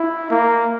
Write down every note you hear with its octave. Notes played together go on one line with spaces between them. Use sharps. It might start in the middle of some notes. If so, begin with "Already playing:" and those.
Already playing: E4
A#3